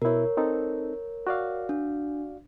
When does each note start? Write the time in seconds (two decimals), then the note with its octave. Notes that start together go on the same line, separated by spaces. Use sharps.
0.02 B2 E4 A#4 C#5
0.37 C4 D#4 A4
1.27 F#4 D5 F5
1.69 D4